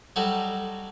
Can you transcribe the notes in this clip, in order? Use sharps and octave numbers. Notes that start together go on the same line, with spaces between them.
F#3 G3 D#4 F#4 A4